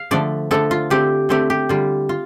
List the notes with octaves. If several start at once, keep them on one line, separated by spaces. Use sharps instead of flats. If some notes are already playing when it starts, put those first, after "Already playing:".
Already playing: F5
D3 F3 A3 D4 D5
D3 F3 A3 D4 A4
F4
D3 A3 C4 G4
D3 A3 C4 G4
G4
D3 G3 F4
F4